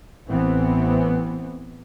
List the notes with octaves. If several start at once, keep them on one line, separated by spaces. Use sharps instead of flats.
A1 E3 B3 C4